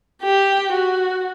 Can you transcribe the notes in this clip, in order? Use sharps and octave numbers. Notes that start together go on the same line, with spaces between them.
G4
F#4